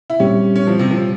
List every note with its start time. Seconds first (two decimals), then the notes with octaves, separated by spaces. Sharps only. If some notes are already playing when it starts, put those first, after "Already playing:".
0.10 E4
0.20 A#2 G3 C4 C#4 G4
0.56 C#4
0.67 F3
0.79 C3
0.91 F3